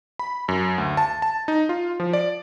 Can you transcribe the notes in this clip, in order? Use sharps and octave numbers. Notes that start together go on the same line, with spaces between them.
B5
F#2
D2
A5
A5
D#4
F4
F3
D5